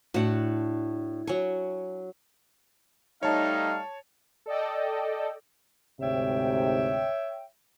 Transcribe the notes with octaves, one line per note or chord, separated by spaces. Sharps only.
A2 D4 F#4 F#5
F#3 G#5 C#6
G3 A3 D#4 C#5 F5 A5
A4 D5 D#5 G5
D2 G#2 C3 C#5 E5 G5